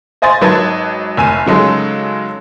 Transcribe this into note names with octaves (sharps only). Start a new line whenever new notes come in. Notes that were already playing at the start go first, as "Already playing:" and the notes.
C5 D#5 G#5 C6 A6
G#1 F#3 D#4 B4 A5 G#6
F1 G#5 D#7
C#3 F#3 G#3 D#4 A4